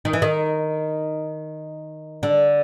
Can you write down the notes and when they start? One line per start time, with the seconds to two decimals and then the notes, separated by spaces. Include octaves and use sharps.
0.05 D#3
0.13 E3
0.22 D#3
2.23 D3